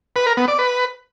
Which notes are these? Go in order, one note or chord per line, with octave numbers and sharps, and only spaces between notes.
B4
A#4
B3
D5
B4